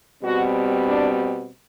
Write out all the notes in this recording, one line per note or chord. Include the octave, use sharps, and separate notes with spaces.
B2 G3 C4 F#4
D4